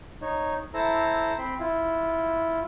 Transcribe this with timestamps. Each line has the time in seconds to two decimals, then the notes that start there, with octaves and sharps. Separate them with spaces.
0.22 D#4 C#5
0.74 E4 A4 C5 A#5
1.38 C4 B5 C6
1.59 E4 F4